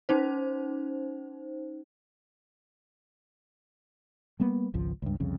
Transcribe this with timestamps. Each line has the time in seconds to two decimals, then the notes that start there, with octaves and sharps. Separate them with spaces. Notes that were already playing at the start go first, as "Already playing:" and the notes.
0.09 C#4 D#4 C5
4.40 G3 A#3 B3
4.74 G#1 C#2 F3
5.02 C#2 G2
5.20 C2 F2 C#3